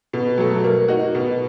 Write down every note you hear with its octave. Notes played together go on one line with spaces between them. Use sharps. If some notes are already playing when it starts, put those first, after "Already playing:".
B2
F#3 A3
A#3
D#4 F#4
B2